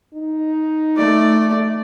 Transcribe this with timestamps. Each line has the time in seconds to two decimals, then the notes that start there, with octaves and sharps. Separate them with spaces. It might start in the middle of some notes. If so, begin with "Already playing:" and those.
0.14 D#4
0.96 A3 D5